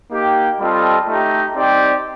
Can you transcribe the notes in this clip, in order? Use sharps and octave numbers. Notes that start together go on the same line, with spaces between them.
A#3 D#4 G4
G3 C4 F4 A4 D#5
A3 D#4 G4
C4 D#4 G4 D5